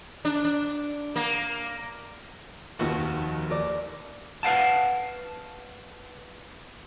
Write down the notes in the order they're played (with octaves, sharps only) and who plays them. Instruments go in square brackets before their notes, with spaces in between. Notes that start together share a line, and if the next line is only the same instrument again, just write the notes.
[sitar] D4
D4
A#3
[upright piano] F1 D#2 [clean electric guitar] D#3 F3 F#4
[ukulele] A#4 D5
[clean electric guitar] B4 F5 F#5 A5